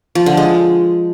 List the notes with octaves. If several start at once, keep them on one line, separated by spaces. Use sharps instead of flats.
F3
D3
G#3